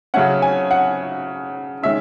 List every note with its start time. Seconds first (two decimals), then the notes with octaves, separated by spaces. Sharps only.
0.14 C#3 F#3 A3 C#4 F#5
0.42 G#5
0.71 F#5
1.83 D#3 G#3 C#4 E5